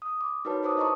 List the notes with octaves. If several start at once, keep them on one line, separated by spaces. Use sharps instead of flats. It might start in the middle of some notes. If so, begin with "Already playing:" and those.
D#6
D6
D#4 F#4 A#4 B4 C#5 A5
A4 A#4 C5 A5 D6 D#6
E4 D#5 A5 A#5 C#6 D#6